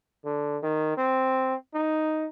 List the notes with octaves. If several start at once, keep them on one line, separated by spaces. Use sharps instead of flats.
D3
D#3
C4
D#4